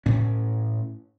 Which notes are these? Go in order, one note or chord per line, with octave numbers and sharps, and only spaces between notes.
A2 C#4